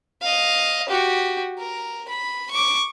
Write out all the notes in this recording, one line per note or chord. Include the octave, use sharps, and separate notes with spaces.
D#5 F5
F#4 G4
A#4
B5
C#6 D6